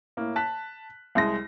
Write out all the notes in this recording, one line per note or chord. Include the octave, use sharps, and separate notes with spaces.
A2 A#3
A5 F#6 B6
C2 G#3 A#6